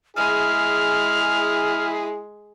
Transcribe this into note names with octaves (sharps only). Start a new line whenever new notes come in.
G#3 E4 G#4 F6